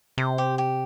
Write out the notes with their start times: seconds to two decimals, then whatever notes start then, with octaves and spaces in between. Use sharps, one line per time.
0.18 C3 C5
0.38 G4
0.58 G4